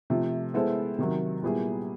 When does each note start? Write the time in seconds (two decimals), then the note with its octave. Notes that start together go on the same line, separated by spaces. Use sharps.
0.10 C3 F3 A3
0.54 G#3 B3 E4 A4 C5
0.98 C3 D#3 F#3
1.42 A#2 G3 B3 E4 G#4